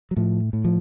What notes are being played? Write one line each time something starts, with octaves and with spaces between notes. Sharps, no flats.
F#3
A2 F3
A2
F3